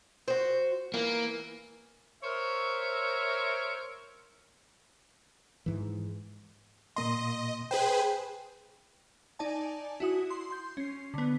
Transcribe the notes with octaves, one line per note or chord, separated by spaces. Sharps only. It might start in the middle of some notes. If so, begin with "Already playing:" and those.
F#4 C5
E3 A#3
A#4 C5 C#5 E5
G#2 E3
A#2 A#3 D#5 C6
G#4 B4 C5 G5
D#4 D5 G#5 A5
E4 F#4 D#6
C6
C6 G6
C#4 C7
D3 B3